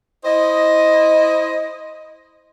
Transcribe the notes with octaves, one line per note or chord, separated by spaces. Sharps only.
E4 C5 D#5